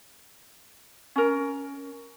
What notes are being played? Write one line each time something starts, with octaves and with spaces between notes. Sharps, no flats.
C#4 A#4